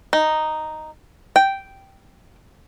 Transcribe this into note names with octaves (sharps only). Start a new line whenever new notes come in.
D#4
G5